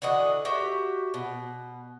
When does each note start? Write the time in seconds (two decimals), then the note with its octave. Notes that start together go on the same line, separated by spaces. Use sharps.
0.02 D3 E3 F#4 D#5
0.45 F#4 G4 E5
1.14 B2